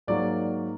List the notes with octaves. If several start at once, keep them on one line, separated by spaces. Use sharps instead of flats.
G#2 F#3 A#3 D5